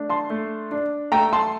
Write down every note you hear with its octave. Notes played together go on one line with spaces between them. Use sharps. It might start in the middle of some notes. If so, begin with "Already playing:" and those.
Already playing: A3 D4
A5 C6
A3
D4
A3 G5 A#5
A5 C6